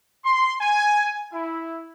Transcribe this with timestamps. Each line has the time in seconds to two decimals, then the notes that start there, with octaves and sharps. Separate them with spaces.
0.25 C6
0.61 G#5
1.33 E4